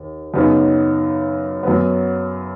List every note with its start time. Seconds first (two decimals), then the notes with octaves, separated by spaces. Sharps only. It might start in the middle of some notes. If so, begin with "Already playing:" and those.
Already playing: D#2
0.34 F#2 C#3 B3 D#4 F#4
1.63 F#2 F#3 B3